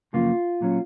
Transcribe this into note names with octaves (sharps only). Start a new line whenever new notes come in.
F#2 C#3 F3 A#3 F4
A#2 F#3 C#4